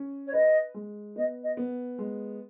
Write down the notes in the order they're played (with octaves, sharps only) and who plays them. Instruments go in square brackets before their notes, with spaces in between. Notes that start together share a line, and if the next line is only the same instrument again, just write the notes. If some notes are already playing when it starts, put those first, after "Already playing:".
Already playing: [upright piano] C#4
[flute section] C#5
[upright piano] B4 [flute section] D#5
[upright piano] G#3
[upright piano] B3 [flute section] D#5
[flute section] D#5
[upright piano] B3
G#3